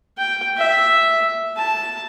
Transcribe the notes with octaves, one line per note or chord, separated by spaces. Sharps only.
G5
E5
A5